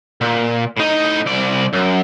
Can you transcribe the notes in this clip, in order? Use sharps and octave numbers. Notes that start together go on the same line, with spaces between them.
A#2
A2 D#4
C2 D5
F#2